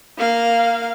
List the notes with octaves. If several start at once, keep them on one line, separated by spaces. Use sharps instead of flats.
A#3 F5